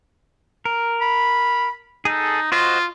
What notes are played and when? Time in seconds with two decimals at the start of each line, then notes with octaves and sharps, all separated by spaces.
0.65 A#4
1.01 B5
2.05 D#4 G#4 A4
2.52 F4 F#4 C5 D#5